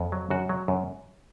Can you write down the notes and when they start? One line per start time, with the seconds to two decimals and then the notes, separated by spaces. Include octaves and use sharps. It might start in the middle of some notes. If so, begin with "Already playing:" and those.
Already playing: F2
0.12 F#3
0.30 F#2 F#4
0.49 F#3
0.68 F#2